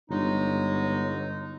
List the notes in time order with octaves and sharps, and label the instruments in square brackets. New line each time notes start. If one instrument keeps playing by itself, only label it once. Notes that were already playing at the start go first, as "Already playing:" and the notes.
[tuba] G1 [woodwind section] F#3 G#3 D#4